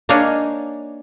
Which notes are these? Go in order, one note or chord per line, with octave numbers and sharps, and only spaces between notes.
A#3 D4 D#4 C#5 F5 G#5